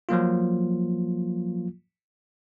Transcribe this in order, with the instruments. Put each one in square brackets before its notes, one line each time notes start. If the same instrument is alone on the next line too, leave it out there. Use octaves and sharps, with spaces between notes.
[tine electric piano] F3 F#3 A#3 F4